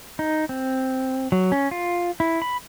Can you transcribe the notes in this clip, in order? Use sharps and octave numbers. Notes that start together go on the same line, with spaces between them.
D#4
C4
F#3
C#4
F4
E4
B5